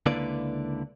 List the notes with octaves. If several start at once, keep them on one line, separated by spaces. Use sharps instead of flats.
C#2 D3 A#3 E4 B4 D5